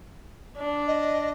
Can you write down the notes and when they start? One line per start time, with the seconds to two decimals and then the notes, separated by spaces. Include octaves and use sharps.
0.58 D4
0.87 D#5